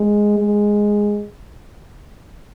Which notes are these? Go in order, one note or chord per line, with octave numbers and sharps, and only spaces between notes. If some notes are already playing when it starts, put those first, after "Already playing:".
Already playing: G#3
G#3